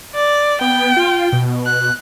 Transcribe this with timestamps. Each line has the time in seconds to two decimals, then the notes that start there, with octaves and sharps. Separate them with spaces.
0.15 D5
0.61 B3 G5
0.97 F4
1.33 B2
1.66 F#6